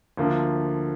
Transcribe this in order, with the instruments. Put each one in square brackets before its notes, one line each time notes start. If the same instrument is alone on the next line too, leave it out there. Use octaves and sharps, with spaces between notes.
[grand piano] D2 D3 F3 A#3